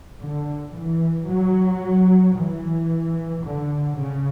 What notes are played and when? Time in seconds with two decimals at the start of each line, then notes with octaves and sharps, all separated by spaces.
0.20 D3
0.73 E3
1.27 F#3
2.36 E3
3.44 D3
3.97 C#3